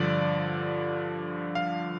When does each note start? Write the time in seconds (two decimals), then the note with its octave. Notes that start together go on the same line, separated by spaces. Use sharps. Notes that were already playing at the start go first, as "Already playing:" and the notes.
Already playing: G2 D3 F3 D5
1.55 F5